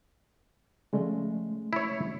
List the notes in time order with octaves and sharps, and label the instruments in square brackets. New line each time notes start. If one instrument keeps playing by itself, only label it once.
[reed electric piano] C#3 G#3 A3 [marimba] F3 D5
[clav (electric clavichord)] E4 C#5